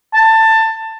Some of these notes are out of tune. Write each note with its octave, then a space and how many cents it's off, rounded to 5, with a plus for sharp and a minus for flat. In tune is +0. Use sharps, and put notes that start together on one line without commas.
A5 +20